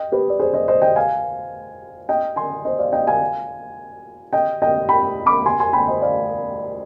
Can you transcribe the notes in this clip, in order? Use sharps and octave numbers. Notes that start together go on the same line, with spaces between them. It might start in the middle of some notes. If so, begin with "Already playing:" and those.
Already playing: D#5 G5
G4 B4
D5
G#4 C5
C5 D#5
C5 D#5
D#5 G5
F5 G#5
D#5 G5
G#5 C6
C5 D#5
D5 F5
D#5 G5
F5 G#5
D#5 G5
D#5 G5
G5 B5
B5 D6
G#5 C6
G#5 C6
G5 B5
C5 D#5
D5 F5